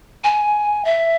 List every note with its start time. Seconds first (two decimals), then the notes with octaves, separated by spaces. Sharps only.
0.24 G#5
0.85 E5